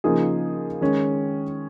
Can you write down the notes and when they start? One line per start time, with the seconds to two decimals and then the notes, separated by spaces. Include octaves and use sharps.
0.04 C#3 F3 A#3 D#4 G#4
0.81 D#3 G#3 C#4